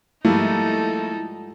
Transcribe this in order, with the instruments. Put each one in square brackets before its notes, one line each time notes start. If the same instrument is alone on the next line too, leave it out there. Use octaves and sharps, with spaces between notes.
[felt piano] G#2 F3 G3 [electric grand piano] A3 A#3 [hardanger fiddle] D#4 A4 [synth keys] E4